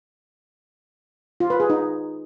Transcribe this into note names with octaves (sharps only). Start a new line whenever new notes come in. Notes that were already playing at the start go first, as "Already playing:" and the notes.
F4
B4
G#4
D#4